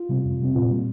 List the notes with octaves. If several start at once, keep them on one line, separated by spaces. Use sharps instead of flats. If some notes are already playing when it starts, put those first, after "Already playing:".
Already playing: F4
C3 G3 C4
F2
C3 G3 C4
A#2 F4
G3 A#3